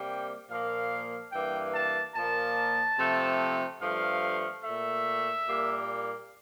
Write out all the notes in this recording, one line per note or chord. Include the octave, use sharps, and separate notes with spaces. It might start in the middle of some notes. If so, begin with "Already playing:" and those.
Already playing: C3 G3 A#3 G5
A#2 F3 A#3 F5
G2 E3 A#3 G5
A5
A#2 F3 A#3 A5
C3 F3 A3
G2 F3 A3 F5
A#2 A3 E5
A#2 G3 A#3